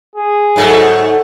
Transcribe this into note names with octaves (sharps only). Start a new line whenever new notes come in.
G#4
G#2 F#3 A3